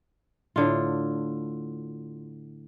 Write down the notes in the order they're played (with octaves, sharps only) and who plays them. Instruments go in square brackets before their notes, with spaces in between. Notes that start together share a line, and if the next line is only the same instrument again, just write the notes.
[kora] A2 D3 F4